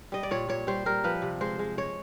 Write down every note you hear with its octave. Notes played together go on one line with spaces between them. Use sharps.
G3 D#5
D5
A#2 C#5
A#2 C#5
G3 C5
G3 A#4
F3 B4
C3
G#3 C5
G#3
G#3 C#5